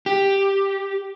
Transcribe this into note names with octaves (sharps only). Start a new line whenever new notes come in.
G4